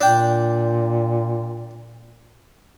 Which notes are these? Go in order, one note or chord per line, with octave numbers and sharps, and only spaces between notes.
A#2 D4 G5